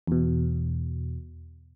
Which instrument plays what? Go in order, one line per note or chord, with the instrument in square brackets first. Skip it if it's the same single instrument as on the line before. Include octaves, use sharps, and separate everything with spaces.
[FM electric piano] E2 B2